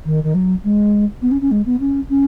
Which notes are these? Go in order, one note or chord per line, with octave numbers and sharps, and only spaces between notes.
D#3
D#3
F#3
G#3
B3
C#4
C#4
G#3
B3
C#4
C#4